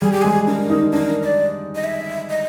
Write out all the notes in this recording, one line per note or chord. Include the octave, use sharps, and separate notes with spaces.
G3 G#4
G4
G#3 G#4
D4 A#4
D#4
D4 A#4
D5
D#5
E5
D#5